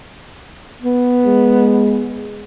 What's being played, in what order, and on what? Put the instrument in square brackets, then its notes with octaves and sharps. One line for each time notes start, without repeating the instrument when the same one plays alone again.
[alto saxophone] B3
[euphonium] G#3